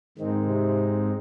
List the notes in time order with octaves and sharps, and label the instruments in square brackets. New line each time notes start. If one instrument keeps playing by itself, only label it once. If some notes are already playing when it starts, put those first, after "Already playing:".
[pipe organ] G#2 G#3 C4 D#4 [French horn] D#3
[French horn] C3